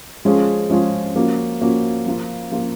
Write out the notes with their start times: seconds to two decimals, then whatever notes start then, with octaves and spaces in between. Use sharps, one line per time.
0.25 F3 G#3 C#4 F4 G#4
0.70 F3 G#3 C#4 F4 G#4
1.15 F3 A#3 C#4 F#4
1.61 F3 A#3 C#4 F#4
2.06 F3 A#3 F4
2.51 F3 A#3 F4